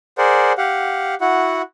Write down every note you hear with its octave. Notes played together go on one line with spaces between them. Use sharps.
G#4 A#4 C5 D5 F#5
G4 F5 F#5
E4 F#4 F#5